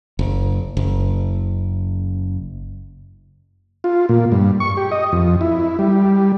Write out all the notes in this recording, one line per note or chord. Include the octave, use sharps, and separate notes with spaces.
F#1
F#1
F4
A#2
G2
C#6
G4
D#5
F2
E4
G3